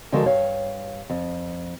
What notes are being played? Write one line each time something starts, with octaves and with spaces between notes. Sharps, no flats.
D3 F3 G#3 F#4 A4 A#4
G2 C#5 F5
F2